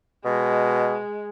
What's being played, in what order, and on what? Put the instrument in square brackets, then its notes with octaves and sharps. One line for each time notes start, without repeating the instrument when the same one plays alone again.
[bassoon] B2 [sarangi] G#3